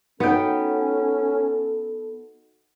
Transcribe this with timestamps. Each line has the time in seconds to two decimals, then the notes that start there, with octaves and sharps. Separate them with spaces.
0.20 B3 C#4 D#4 F#4 A4 G5